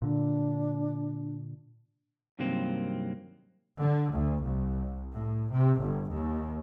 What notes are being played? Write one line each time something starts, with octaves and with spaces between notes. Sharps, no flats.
A#2 D3 D4
G2 C3 D#3 F#3 A#3 C4
D3
D2
C2
A2
C3
G1
D#2